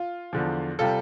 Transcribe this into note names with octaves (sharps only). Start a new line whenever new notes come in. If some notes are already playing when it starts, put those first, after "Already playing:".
Already playing: F4
E2 D3 F3
C3 G3 F4 A4